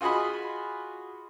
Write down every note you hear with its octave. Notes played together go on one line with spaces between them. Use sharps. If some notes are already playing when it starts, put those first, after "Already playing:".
F4 F#4 G#4 D#5 B5